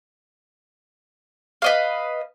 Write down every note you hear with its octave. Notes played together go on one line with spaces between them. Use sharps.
B4 D#5 F5